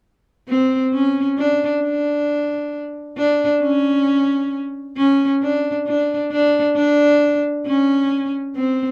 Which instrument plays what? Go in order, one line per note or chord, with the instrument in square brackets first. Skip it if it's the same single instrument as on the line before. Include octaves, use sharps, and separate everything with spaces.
[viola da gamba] C4
C#4
D4
D4
D4
C#4
C#4
D4
D4
D4
D4
C#4
C4